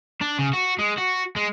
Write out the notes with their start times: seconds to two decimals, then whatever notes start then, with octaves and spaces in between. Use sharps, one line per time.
0.21 D4
0.39 C#3
0.54 F#4
0.79 G#3
0.98 F#4
1.36 G#3